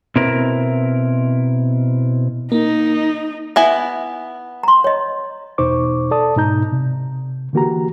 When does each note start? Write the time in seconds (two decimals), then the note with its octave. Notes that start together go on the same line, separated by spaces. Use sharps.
0.16 B2 C4 E4 A#4
2.52 A#3 D#4
3.56 B3 E4 E5 G#5
4.63 A#5 C6
4.84 C#5 D#5
5.58 E2 B2 D#4 C5 C#6 D6
6.11 A4 D5 A5 D#6
6.36 G#2 B2 D#4 A#5 G6
6.72 C3
7.53 D3 E3 A#3 F#4 G4 A#5